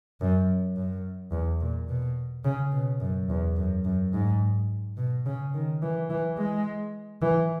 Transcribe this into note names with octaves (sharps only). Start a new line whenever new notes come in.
F#2
F#2
E2
A#2
B2
C#3
B2
F#2
E2
F#2
F#2
G#2
B2
C#3
D#3
E3
E3
G#3
E3